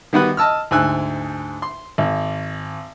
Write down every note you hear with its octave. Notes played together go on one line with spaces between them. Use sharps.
D#3 G3 B3 F#4 B4 F#6
D#5 A5 E6 F6
D2 G#2 G#5 E6 F#6
C6
G#1